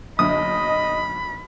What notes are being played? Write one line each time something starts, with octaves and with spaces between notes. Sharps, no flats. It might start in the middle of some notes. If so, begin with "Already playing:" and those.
F#1 B1 D3 D#5 B5 D#6